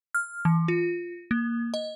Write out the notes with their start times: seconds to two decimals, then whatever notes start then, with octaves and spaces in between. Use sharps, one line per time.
0.15 F6
0.45 E3
0.68 F4
1.31 A#3
1.74 D#5